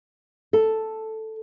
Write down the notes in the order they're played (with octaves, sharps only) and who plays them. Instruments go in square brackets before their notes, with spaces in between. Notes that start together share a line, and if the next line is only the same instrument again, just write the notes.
[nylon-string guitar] A4